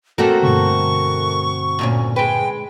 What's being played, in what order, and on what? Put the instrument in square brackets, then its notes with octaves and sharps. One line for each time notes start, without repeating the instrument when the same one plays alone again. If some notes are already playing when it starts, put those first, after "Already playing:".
[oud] A3 A#3 A#4 [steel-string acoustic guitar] C4 F#4 C5 [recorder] A4
[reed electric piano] G2 B2 D3 [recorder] C#6
[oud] D2 A#2 C#4
[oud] G#3 B4 [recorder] G5